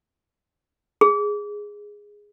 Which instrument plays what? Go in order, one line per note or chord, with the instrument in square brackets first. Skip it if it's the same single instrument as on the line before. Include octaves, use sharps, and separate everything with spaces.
[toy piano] G#4